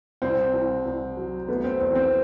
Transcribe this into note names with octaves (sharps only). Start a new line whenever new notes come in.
C2 C4
C2
C2
F#3
A3 B3
C4
E2 C4
C4